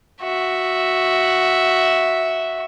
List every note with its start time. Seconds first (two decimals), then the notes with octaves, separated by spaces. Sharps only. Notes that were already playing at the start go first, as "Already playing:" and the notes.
0.23 F#4 E5